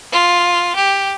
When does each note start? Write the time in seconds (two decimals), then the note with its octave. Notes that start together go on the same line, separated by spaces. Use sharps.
0.12 F4
0.76 G4